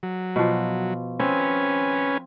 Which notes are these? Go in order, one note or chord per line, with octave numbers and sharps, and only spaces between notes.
F#3
B2 F3
C4 C#4 B4 G#5